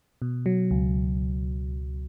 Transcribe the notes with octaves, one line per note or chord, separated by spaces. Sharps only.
B2
F#3
C#2